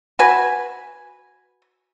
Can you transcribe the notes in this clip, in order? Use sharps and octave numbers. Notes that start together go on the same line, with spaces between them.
F#4 B4 G#5